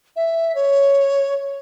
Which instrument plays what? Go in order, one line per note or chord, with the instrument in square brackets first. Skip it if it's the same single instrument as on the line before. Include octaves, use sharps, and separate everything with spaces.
[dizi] E5
C#5